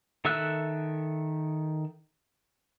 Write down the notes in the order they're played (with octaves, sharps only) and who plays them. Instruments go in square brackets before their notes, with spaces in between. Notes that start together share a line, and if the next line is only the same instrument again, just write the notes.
[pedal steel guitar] D#3 A4 E5 E6 F#6